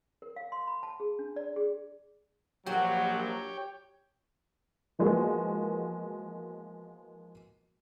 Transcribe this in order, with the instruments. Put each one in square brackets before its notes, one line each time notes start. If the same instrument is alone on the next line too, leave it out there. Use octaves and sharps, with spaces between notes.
[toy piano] A#4
F5
C6
B5
A5
G#4
D4
D5
G#4
[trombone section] A#1 F#3 [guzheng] F#4 [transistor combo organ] G4 C#5 G5
[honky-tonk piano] E3 F3 G#3 A#3 B3 F#4